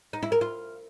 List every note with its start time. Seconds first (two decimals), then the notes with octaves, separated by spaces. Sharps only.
0.13 D#4
0.23 E4
0.32 A#4
0.41 F4